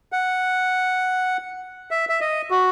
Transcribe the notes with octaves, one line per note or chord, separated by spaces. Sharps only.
F#5
E5
E5
D#5
F#4